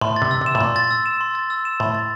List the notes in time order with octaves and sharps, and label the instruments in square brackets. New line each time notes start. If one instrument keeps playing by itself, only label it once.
[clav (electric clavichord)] A2 [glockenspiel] C6
[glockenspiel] A6
[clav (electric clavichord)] C3
[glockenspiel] E6
[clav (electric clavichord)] C3 [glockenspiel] E7
[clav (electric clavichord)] A2
[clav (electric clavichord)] A#2 [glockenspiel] C6
[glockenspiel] A6
E6
E7
C6
A6
E6
E7
[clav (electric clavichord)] A2 [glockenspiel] C6
[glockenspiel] A6